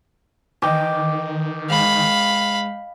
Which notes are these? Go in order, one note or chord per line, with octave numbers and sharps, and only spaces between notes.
D#3 E3 D#5 G5 D6
G#2 F5 B5